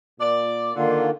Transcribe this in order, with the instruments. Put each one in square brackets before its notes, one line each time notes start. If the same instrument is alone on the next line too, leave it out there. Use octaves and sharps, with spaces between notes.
[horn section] A#2 D5
[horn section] D3 [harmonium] D#3 A#3 F4